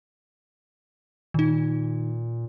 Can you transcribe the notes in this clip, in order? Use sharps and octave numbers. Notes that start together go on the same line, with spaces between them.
A#2 D#3 D#4